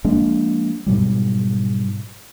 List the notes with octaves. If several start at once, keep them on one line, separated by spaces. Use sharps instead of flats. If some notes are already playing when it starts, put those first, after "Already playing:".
F3 G#3 A#3 D4
G#2 B2 F#3 G3